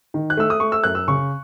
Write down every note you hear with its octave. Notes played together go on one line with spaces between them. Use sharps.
D#3
F#6
A3 E6
D#6
A3 C#6
E6
F#2 F#6
E6
C#3 C#6